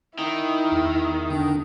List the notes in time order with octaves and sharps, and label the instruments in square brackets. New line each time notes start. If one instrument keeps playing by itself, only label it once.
[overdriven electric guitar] D#3 [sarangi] E4
[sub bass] E2
[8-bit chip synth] D3 D4